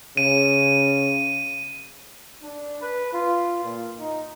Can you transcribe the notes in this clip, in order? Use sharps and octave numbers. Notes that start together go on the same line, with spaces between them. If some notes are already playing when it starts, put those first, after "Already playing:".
C#3 D#7
D4
B4
F4
A#2
D#4